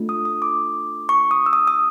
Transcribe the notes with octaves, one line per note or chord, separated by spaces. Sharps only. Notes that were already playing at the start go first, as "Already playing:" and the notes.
Already playing: A3 D4 F4
D#6
D#6
D6
C#6
D#6
E6
D#6
D#6